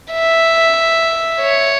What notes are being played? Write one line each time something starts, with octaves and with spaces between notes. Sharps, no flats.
E5
C#5